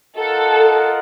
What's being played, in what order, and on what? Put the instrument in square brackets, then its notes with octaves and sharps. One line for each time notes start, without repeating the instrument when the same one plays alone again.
[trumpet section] F4 A#4 D#5 F#5 [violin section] A4